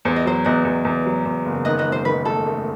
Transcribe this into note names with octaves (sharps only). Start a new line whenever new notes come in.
E2 C5
D#5
F#3 C5
E2 B4 D#5
E2
E2
F#3
E2
F#1
D#3 B4 D#5
B4 D#5
E1
C5
D#3 B4
A3 A4
A3